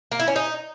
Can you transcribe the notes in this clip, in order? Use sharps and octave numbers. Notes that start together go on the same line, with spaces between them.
A#3
E4
C#4
D#4